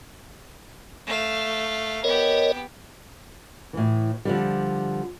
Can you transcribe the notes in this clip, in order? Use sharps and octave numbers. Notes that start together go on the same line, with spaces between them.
A3 F5
B3 G4 A#4 C#5 D#5
A2 E3
D3 F3 G3